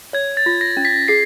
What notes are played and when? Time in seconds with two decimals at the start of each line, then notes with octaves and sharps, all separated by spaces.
0.13 C#5 G#6
0.37 A6
0.46 F4
0.61 A#6
0.77 C#4
0.85 B6
1.08 G#4 C7